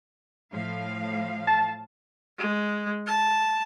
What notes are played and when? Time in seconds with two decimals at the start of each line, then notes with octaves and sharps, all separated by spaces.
0.52 A2 F3 F5
1.47 A5
2.38 G#3
3.06 A5